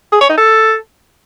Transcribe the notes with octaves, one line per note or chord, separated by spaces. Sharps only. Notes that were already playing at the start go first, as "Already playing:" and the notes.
G#4
C#5
D#4
A4